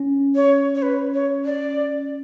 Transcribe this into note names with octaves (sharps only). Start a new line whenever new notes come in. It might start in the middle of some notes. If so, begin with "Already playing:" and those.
Already playing: C#4
C#5
C#5
B4
C#5
D5